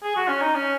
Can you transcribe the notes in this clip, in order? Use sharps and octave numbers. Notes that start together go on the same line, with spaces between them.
G#4
F#4
C#4
D#4
C#4